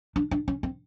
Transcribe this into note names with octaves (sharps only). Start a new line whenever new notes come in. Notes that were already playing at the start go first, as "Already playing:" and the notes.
D4
D4
C#4
C4